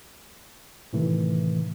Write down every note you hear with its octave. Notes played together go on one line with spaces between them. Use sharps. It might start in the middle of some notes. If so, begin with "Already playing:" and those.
A2 C3 D#3 E3 A3